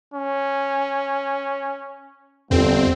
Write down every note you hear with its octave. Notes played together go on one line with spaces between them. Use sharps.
C#4
G1 E2 C4